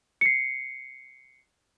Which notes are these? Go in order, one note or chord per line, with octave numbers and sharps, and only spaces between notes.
C7 C#7